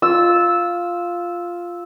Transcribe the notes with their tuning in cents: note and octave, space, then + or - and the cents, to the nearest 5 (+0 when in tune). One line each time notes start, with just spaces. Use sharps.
F4 +0 E6 -10